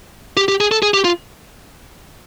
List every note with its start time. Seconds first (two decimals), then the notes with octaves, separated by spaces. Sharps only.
0.37 G4
0.48 G4
0.61 G#4
0.71 A4
0.82 G#4
0.94 G4
1.04 F4